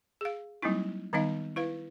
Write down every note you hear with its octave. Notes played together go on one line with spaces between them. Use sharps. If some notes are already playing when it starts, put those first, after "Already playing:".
G#4 F5
F#3 G3 A#3 C4 D#4 E4
D#3 G3 B3 D#4 D#5 F5
E4 B4 F5